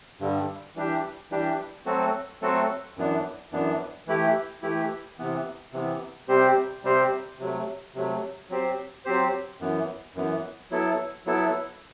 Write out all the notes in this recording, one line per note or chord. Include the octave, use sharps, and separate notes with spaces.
G2 D3 G3
E3 G3 D4 G4
E3 G3 D4 G4
F#3 A3 C4 F#4 A4
F#3 A3 C4 F#4 A4
F#2 E3 B3 D4
F#2 E3 B3 D4
E3 A3 E4 G4
E3 A3 E4 G4
C3 E3 B3
C3 E3 B3
C3 G3 C4 G4 C5
C3 G3 C4 G4 C5
C3 F#3 A3
C3 F#3 A3
F#3 C4 G4 C5
F#3 C4 G4 C5
F#2 E3 B3
F#2 E3 B3
F#3 B3 E4 A4
F#3 B3 E4 A4